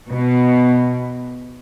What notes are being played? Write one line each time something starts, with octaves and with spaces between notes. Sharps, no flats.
B2